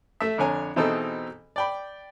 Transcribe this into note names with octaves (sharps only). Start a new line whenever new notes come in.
A3 E5
F2 D3 C#5 G#5 A#5
B2 E3 C4 D#4 G#4 A4
D5 G5 B5